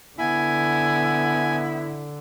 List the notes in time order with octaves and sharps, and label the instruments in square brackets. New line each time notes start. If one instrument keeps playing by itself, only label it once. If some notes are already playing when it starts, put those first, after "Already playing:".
[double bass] D3 [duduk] B3 [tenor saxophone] E4 [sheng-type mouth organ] G#5